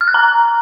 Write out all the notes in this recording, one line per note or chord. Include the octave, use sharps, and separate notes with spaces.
F6
F#6
A#5